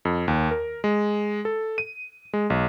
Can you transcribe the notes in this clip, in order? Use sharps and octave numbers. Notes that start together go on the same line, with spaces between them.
F2
D#2
A#4
G#3
A4
D#7
G#3
B1